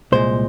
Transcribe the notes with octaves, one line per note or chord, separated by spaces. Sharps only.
C2 A#2 G#3 C5